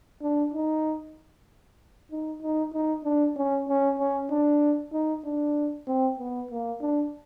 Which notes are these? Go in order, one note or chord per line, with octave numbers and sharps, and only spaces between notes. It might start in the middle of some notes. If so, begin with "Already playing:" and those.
D4
D#4
D#4
D#4
D#4
D4
C#4
C#4
C#4
D4
D#4
D4
C4
B3
A#3
D4